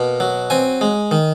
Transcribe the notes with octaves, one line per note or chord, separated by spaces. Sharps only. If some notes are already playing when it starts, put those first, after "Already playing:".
Already playing: B2 A#3
F#3
C4 G#5
G#3
D#3